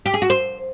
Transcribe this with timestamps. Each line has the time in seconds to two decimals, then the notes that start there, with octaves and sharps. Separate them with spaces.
0.06 G4
0.14 G#4
0.22 F#4
0.30 C5